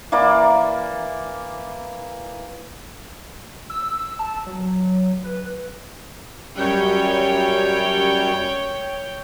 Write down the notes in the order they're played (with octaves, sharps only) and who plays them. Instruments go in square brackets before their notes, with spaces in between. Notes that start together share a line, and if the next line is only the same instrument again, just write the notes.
[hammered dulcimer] E3 A#3 D5 D6
[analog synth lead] E6
A5
F#3
B4
[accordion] F#2 G3 [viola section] C#5 G5